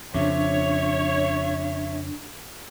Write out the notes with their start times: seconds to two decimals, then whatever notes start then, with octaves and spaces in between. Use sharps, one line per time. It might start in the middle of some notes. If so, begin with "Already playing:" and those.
0.14 F2 C#3 F3 D4 C#5 E5